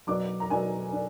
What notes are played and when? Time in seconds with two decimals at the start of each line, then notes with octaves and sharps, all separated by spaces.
0.07 B2 F#3 D4 D6
0.40 A#5
0.50 B2 F#3 D4 G#5
0.92 D4